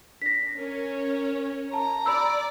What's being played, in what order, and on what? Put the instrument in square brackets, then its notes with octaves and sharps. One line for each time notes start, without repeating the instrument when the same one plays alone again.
[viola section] D4 [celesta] A#6 B6
[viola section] C#4 A#4 C#5
[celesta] A5 [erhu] A#5
[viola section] D5 [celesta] B5 E6